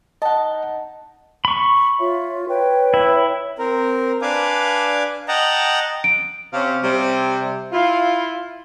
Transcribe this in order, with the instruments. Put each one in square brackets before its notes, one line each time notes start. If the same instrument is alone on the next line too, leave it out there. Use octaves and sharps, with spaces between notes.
[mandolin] D#4 A5 [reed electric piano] D#5 F#5
[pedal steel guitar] B5 C#6
[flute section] F4 C#5 E5
B4 C#5 G5
[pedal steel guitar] E4
[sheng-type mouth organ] C4 A#4
D4 B4 F5 G#5 D6
D#5 F#5 G5 A5 A#5
[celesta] D7
[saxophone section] C3 C#4 F5
C3 G3
E4 F4